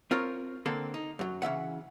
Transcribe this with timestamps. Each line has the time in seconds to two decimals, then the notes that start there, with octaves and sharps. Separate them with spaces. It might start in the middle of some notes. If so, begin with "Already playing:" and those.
0.11 C4 F4 A#4 C#5
0.66 D3 A#3 C4 A4
0.94 D#4
1.19 F#2 F#3
1.42 C#3 E3 E5 F#5